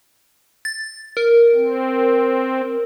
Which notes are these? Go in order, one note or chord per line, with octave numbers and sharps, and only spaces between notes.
A6
A#4
C4